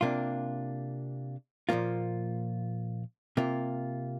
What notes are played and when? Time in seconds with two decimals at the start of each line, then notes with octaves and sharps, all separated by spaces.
0.01 C3 A#3 D4 F4
1.69 A#2 F3 A#3 F4
3.37 C3 A#3 F4